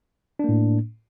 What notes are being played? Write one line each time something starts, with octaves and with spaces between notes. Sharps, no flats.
A2 A#3 D4